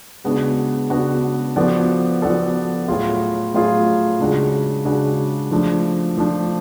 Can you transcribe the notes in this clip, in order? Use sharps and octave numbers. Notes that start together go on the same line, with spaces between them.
C#3 G#3 B3 D4 F#4
C#3 G#3 B3 D4 F#4
F3 B3 F#4 A4 D5
F3 B3 F#4 A4 D5
A2 F#3 A3 F4 G#4
A2 F#3 A3 F4 G#4
C#3 G#3 D4 F#4
C#3 G#3 D4 F#4
F3 A3 D4
F3 A3 D4